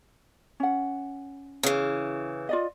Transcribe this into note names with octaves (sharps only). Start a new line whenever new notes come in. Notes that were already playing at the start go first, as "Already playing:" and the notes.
C#4 F#5
C#3 E3
F4 D5 D#5